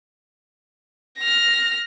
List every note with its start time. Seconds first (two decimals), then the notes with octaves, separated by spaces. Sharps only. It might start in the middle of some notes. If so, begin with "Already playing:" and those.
1.19 F6 A#6